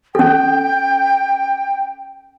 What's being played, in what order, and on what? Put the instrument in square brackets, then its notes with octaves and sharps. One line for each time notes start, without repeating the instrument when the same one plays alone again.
[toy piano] C#4 A4 [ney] G5